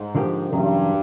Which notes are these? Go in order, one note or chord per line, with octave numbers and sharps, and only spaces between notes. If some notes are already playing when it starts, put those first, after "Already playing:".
Already playing: G#2
D3 F3 A#3 D#4 G4
E2 G2 C#3 F#3 A#3